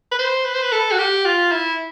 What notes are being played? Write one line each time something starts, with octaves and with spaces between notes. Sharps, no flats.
B4
C5
B4
C5
B4
A4
F#4
G4
F4
E4